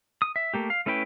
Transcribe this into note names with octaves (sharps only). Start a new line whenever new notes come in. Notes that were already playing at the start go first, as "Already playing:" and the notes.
D#6
E5
A3 A#3 G4
F5
A3 C#4 E4 B4 G5